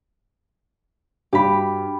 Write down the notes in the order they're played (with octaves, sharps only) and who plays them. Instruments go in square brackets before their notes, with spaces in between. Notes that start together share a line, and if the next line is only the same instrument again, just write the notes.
[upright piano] G2 [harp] G4 B5